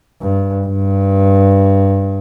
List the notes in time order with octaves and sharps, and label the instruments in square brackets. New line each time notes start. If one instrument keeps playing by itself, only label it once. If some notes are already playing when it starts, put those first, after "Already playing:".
[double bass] G2
G2